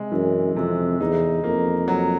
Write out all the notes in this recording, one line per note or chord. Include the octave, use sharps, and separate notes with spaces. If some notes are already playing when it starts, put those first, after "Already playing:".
Already playing: C3 G#3
F#2 E3
F2 C3
E2 D#4
F2 A#3
F#3